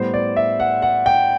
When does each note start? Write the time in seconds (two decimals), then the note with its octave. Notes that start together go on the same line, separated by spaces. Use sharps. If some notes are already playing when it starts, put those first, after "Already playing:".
Already playing: A2 G3 B3 C5
0.14 D5
0.37 E5
0.60 F#5
0.82 F#5
1.06 G5